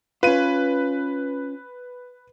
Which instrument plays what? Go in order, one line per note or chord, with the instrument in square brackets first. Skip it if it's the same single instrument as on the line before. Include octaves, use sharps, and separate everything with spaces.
[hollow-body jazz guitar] C#4 F4 [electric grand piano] B4 D#7